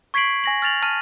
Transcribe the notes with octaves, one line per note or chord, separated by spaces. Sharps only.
C#6 G#6 B6 C7 D7 F#7
G#5 A#6 F#7
F6 A6 F7 F#7
A5 F6 D#7